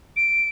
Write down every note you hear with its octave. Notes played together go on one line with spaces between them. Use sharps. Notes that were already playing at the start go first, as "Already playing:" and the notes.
D7